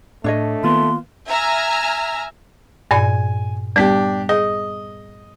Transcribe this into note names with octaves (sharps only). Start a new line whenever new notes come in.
A2 A3 D4 C#5 D#5
D#3 A#3 B3 F4 C6
E5 G#5 A#5 E6 F6
G2 A#2 D5 G#5
G3 B3 D4 G4
G#4 D#5